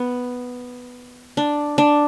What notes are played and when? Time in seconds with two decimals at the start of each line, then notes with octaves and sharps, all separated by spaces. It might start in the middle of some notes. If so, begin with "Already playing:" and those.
Already playing: B3
1.37 D4
1.78 D4